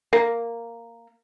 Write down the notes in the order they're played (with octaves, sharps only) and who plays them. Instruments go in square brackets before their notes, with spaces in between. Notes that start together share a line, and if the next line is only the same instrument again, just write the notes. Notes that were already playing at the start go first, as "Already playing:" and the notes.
[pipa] A#3